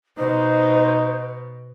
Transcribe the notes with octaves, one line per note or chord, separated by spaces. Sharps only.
B2 D#4 C5